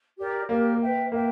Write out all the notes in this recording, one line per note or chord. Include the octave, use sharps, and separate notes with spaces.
G4 A#4 D5
A#3 G4 A#4 D5
B4 E5 G5
A#3 B4 E5 G5